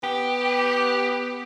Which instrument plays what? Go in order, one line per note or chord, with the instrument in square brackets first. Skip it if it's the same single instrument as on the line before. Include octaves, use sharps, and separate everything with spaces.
[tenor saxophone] B3 [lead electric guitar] G4